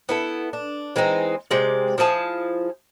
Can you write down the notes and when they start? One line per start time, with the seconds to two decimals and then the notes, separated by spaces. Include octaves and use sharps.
0.09 B3 E4 A4
0.53 D4
0.96 E3 G#3 C4 D#4
1.51 C3 G#3 D5
1.98 F3 E4 G#4 A5